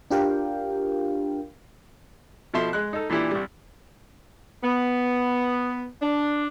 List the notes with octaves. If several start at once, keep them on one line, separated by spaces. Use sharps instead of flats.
D4 F4 G4 A#4 F5 G5
B2 F3 A4 E5 C6
G#3 F#6
D#4 A4
A#2 E3 D4 E4 G4
C2 G3
B3
D4